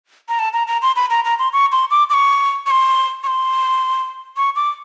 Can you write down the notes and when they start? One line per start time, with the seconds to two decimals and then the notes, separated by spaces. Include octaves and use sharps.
0.29 A#5
0.39 A5
0.53 A#5
0.67 A#5
0.82 C6
0.96 B5
1.10 A#5
1.25 A#5
1.39 C6
1.53 C#6
1.72 C6
1.91 D6
2.10 D6
2.14 C#6
2.66 C#6
2.71 C6
3.23 C#6
3.27 C6
4.37 C#6
4.56 D6